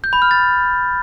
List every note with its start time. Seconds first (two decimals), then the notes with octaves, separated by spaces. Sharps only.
0.04 G6
0.13 B5
0.22 F6
0.31 A6